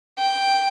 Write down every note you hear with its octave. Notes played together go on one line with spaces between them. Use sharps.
G5